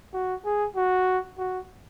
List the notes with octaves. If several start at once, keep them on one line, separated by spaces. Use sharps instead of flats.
F#4
G#4
F#4
F#4